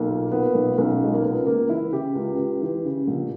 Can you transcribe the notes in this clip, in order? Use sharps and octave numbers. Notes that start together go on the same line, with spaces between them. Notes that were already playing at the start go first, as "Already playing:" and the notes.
Already playing: B1 A#3
A#2
A#2 B3
B1
B1 C#4
A#2 G#3
A#3
C#2 B3
C#2 A#3
E3 E4
C#3 G4
C#2
C#2
E3
C#3
A#1